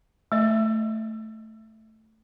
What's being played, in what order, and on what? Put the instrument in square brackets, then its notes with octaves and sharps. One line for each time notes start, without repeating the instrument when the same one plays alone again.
[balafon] A3 D#5